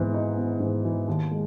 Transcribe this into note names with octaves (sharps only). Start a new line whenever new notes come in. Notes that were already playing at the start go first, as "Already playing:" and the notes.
Already playing: G#2 E3 B3
D#4
B3
G#2
E3
D#2
G#3